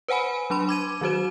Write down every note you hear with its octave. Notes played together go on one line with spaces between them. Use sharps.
B4 C5 F#5 G#5 B5
F#3 D4 B5 C6
D6 G#6 D#7
D#3 F#3 F#4 C5 E7